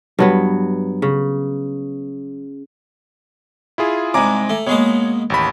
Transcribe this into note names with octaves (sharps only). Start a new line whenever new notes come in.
G2 F#3 B3
C#3
E4 F4 G#4
C2 G#2 G#5 A#5 D6
A3
B2 G#3 A#3 C#5
A1 D#2 B5